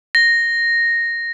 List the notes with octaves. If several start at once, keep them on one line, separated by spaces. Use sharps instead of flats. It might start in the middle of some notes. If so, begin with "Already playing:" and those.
A#6